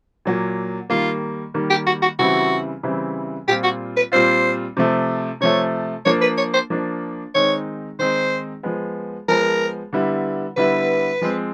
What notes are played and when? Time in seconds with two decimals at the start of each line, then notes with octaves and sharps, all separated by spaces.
0.25 A#2 F#3 A#3
0.90 D#3 G3 A#3 F4
1.54 D#3 G3 A#3
1.70 G4
1.87 F#4
2.02 F#4
2.19 C#3 E3 G3 C4 E4 F#4
2.83 C#3 E3 G3 C4 E4
3.47 A#2 G3 C4 F4 G4
3.64 F#4
3.97 B4
4.12 A#2 G3 C4 F4 C5
4.77 C3 F3 A3
5.41 C3 F3 A3 C#5
6.05 F3 A#3 D4 C#5
6.21 B4
6.37 C#5
6.54 C5
6.70 F3 A#3 D4
7.35 D#3 G#3 C4 D#4 C#5
7.99 D#3 G#3 C4 D#4 C5
8.63 F3 G#3 B3
9.28 F3 G#3 B3 A#4
9.93 D3 G3 B3 E4
10.56 D3 G3 B3 E4 B4
11.21 F3 G#3 C4